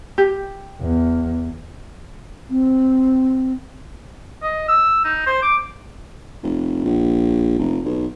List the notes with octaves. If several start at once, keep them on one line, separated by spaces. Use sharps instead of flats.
G4
E2
C4
D#5
E6
D#4
C5
D6
F1
A#1
F1
B1